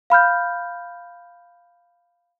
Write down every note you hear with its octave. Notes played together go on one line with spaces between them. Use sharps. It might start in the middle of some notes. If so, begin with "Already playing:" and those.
F5 B5 F6 G6